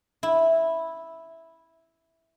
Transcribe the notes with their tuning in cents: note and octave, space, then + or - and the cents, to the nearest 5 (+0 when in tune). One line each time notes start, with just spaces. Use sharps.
E4 -5